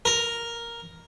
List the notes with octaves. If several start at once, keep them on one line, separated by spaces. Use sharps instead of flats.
A#4